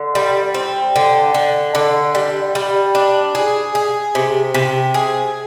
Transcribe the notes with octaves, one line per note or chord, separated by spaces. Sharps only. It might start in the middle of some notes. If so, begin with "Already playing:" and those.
Already playing: D3
G3
C4
D3
D3
D3
G3
G3
D4
G#4
G#4
C3
C3
G#4